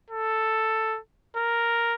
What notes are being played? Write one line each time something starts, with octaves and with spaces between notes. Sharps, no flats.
A4
A#4